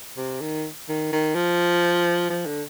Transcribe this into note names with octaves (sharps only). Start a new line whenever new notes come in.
C3
D#3
D#3
D#3
F3
F3
D3